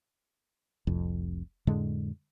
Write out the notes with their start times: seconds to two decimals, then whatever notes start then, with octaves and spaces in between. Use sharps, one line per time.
0.87 F1 C2 F2
1.67 F2 A2 D3 G#3